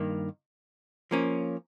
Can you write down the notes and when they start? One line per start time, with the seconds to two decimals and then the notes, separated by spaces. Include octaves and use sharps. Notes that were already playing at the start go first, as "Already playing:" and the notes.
Already playing: G2 D#3 A#3
1.11 F3 A#3 C#4